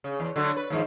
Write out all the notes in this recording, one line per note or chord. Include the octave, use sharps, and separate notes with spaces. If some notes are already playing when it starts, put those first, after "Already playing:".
C#3
E2
D3 F#3 A3
B4
D#2 G#2 F3